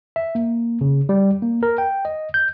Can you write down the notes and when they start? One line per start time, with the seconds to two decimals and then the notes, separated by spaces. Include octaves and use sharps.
0.16 E5
0.35 A#3
0.81 C#3
1.09 G3
1.42 A#3
1.63 A#4
1.78 G5
2.05 D#5
2.34 G6